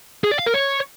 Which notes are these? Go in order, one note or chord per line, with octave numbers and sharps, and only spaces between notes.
G#4
D5
F5
A#4
C#5